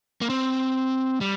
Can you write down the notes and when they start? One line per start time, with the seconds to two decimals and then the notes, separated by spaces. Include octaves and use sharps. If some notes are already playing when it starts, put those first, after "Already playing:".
0.21 A#3
0.30 C4
1.21 G3